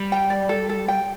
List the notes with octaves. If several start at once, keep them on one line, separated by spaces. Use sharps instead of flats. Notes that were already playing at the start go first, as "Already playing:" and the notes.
Already playing: G3
G5
D5
A4
A4
G5